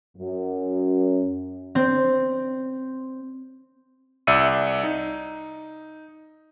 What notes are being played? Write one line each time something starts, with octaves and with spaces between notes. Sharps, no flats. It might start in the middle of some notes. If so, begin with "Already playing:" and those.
F#2
C4
C2 D5 E5 E6 C#7 D#7
D#4